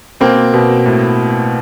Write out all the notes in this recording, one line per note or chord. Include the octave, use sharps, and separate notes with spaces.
B2 A#3 C4
B2
A2